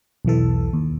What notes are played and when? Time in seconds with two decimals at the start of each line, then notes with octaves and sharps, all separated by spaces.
0.25 B1 E2 E3 A4
0.73 D#2